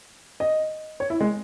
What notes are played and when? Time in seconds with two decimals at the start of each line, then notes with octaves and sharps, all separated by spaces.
0.40 D#5
1.00 C#5
1.10 E4
1.21 G#3